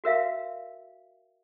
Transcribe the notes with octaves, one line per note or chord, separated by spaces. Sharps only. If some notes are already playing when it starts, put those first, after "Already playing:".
F#4 A#4 E5 F5